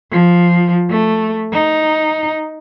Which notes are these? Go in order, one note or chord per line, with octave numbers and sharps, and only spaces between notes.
F3
A3
D#4